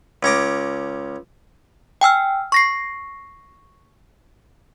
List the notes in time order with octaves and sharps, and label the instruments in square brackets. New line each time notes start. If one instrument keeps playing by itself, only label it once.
[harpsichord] C#2 C#4 A#5 D6
[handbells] G5 G#5 E6 F6
C#6 A#6 C7